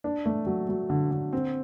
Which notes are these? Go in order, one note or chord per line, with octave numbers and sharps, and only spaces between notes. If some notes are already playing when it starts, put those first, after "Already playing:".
D4
A3
F#3
F#3
D3
D3
C4